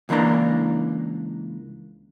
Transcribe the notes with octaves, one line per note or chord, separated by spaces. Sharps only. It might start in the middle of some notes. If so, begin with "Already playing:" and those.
C#2 E3 A#3 D4 A#5